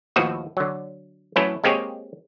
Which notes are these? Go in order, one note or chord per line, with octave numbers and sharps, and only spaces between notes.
D#2 A2 F3 F#4 B4 E5
D3 F#3
A2 E3 F#3 A3 C#4 E4
G#3 A#3 C4 G4 G#4 C#5